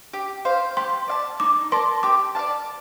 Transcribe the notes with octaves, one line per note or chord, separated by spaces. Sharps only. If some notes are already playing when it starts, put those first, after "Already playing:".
G4
C5 F5
G4 C6
D5 F5 A5
D#4 D6
A#4 D5 A5 C6
G4 D6
D5 F5 A5